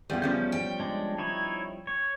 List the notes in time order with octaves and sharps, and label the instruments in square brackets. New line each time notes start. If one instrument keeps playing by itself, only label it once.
[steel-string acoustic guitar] E2 [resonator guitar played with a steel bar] G3 F4
[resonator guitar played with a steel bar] F3 G3 C#4 [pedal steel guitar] G6
[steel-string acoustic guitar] G5
[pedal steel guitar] G#3 D4
D#4 E4 C#5
C#5